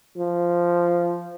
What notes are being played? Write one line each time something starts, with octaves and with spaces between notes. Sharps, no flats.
F3